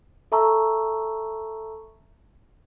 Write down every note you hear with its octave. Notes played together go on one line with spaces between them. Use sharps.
A4 E5 A5 A#5 C#6 E6